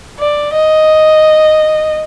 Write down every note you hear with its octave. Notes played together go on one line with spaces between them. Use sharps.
D5
D#5